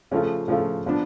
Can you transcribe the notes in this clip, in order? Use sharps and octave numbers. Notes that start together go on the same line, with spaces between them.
C#3 F3 A3 F4
C#3 F3 A3 F4
F3 B3 D4